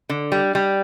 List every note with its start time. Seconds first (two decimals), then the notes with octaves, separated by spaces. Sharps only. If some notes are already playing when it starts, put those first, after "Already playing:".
0.09 D3
0.32 G3
0.55 G3